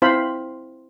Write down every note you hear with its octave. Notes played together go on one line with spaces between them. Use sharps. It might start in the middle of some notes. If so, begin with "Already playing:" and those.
C4 E4 C5 F5 A5 B5